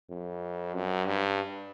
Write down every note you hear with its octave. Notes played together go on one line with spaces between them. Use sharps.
F2
F#2
G2